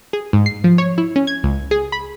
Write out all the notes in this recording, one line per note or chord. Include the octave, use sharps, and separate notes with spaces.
G#4
G#2
C7
F3
C#5
E4
C#4
G#6
C#2
G#4
B5